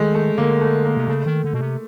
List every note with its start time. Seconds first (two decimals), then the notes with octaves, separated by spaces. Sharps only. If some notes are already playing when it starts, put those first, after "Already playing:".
Already playing: D#3 G#3 A3
0.14 A3
0.38 D3 A#3
0.61 A3
0.85 A#3
0.97 C3
1.08 C#3 A3
1.26 D#3
1.44 D3
1.54 B2
1.61 C3